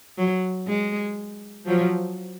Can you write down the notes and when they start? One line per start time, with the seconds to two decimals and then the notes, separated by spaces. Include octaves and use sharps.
0.18 F#3
0.68 G#3
1.67 F3 F#3